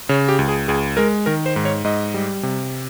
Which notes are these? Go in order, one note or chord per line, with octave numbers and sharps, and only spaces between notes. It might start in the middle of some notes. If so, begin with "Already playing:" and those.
C#3 C#5
G4
C#2
G#4
C#2 G#4
G#3 A#4
D#3 A#4
C5
G#2
C#5
G#2 D#5
G3
C3